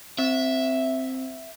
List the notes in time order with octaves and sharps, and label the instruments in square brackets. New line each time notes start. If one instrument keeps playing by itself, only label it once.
[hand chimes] C4 [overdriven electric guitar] E5